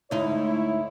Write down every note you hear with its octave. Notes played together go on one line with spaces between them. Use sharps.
D2 G#2 D#4 E4 C#5